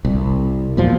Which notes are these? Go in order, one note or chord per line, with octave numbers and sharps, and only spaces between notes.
C2
E2 A#2 F3